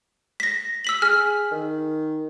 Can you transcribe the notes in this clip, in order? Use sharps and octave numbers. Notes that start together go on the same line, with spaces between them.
A#6 B6
E6 B6 F#7
G#4 F6
D#3